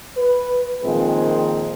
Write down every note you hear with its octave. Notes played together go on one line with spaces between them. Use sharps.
B4
A#2 D#3 F3 G#3 C4 G#4